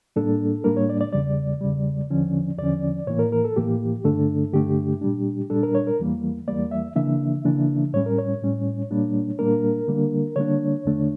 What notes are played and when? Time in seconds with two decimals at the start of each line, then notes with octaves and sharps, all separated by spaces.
0.16 A2 G3 A#3 D4 A4
0.64 A2 G3 A#3 D4 A#4
0.77 C#5
0.89 D5
1.01 D5
1.12 E2 C#3 G3 D5
1.61 E2 C#3 G3
2.10 E2 D3 F3 C#4
2.58 E2 D3 F3 C#4 D5
3.07 A2 E3 A#3 C#5
3.19 A#4
3.32 A#4
3.45 A4
3.56 A2 E3 A#3 G4
4.04 G2 D3 A3 D4 A4
4.53 G2 D3 A3 D4 G4
5.01 A#2 G3 D4
5.50 A#2 G3 D4 A4
5.63 A#4
5.75 C#5
5.87 A#4
5.99 E2 E3 G3 A#3
6.48 E2 E3 G3 A#3 D5
6.71 E5
6.96 C#3 E3 A#3 D4 E5
7.45 C#3 E3 A#3 D4
7.93 A2 G3 C#4 C#5
8.06 A#4
8.18 C#5
8.42 A2 G3 C#4
8.91 A#2 G3 A#3 D4
9.39 A#2 G3 A#3 D4 A#4
9.88 D3 G3 A#3 D4
10.36 D3 G3 A#3 D4 C#5
10.85 E2 D3 A3 D4